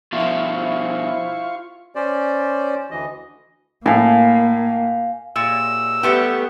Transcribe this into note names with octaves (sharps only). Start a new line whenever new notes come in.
B2 F3 E4 F4 C5 E5 F5 C#6
C#4 C5 D5
D2 E3 D#5
A2 A#3 F5 G#5
A#2 E6
G3 A3 B3 G4